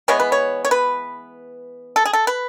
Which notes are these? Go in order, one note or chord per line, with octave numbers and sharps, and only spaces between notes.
E3 G#3 B3 C#5
B4
C#5
C#5
B4
A4
G#4
A4
B4